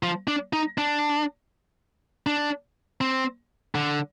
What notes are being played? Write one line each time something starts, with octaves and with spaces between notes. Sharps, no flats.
F3
D4
D#4
D4
D4
C4
D3